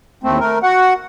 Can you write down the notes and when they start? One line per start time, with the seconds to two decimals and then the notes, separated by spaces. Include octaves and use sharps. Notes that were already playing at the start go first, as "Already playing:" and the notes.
0.24 D#2 A2 A3 C4
0.40 A3 A#4
0.63 F#4 F#5